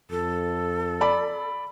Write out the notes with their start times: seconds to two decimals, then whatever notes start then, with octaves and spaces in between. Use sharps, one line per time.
0.11 F2 A4
1.01 D5 B5